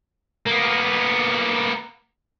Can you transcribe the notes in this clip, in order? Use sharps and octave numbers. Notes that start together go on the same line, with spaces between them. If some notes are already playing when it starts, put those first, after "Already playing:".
A#3 B3